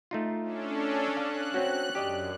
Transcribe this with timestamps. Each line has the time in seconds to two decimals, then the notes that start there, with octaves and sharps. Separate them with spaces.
0.11 A3 D#4 F4
0.42 C#4 D4 A4
1.17 F5 F#6
1.54 C4 C#4 F#4
1.95 F#2 G4 D5 D#5